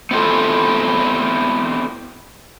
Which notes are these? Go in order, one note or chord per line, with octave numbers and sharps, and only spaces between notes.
B3 C4 E4 F4 A4